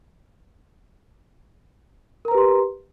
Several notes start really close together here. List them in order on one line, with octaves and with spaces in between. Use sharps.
A#4 A#5 B4 G4 C6